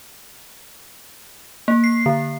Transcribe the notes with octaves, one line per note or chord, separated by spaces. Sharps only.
A#3
C7
D3